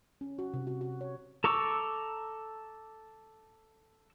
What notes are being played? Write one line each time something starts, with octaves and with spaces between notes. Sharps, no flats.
C#4
F#4
C3
F#4
F#4
C#5
A4 A#5 C#6 D6 E6